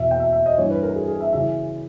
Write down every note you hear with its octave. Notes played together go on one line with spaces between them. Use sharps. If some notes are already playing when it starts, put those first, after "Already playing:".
Already playing: E2 B2 E5
G5
E5
E5
D#5
G2 E3 C#5
B4
A#4
G#4
G#4
E5
C#3 E3 E5